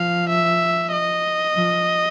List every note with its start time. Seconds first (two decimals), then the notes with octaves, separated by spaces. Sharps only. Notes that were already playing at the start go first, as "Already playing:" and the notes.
Already playing: F3 F5
0.29 E5
0.92 D#5
1.56 F3